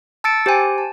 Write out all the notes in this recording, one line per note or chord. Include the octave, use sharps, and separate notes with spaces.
A5 E6 A6 C#7 D7
G4 C5 G5 G#5
A5